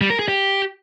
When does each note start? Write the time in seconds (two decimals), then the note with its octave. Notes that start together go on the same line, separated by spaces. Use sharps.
0.01 G3
0.10 A#4
0.19 G#4
0.28 G4